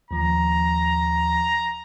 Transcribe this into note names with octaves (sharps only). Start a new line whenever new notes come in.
D#2 F3 A#5